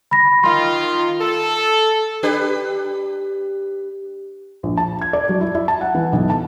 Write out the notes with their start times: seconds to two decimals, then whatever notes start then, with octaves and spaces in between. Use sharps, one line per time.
0.11 B5 A#6
0.44 D#3 F4 C6
1.21 A4
2.23 D4 G4 B4
4.63 A#1
4.77 A5
5.01 G#6
5.13 D5
5.29 F#3
5.41 E4
5.55 E4
5.68 A5
5.81 F#5
5.95 E3
6.13 B1
6.30 A5